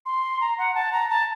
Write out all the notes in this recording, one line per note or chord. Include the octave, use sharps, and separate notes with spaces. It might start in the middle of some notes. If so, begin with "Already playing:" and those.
C6
A#5
F#5
A5
A#5
A5